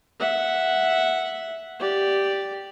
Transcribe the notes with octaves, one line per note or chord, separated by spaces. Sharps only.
E5 F#5
G4 D5